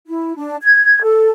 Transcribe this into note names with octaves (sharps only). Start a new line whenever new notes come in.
E4
D4
G#6
A4